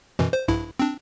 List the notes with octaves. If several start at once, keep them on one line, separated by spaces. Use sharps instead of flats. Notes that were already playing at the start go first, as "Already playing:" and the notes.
F#2 B2 E3
C5
A#1 G2 E4
C4 D4